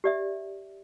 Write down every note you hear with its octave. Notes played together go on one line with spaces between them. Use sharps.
G4 D5 E5